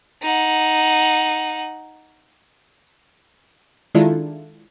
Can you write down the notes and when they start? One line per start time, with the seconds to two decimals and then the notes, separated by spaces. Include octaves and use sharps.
0.22 D#4 F#5
3.95 D#3 G#3 D4 E4 F4 A4